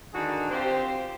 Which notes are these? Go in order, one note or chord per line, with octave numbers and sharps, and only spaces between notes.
D3 D#3 D4 F#4 G#4
C4 F4 G4 C5